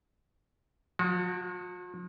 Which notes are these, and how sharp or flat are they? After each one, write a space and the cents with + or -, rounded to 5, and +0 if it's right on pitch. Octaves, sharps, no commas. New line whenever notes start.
F3 +45 F#4 +0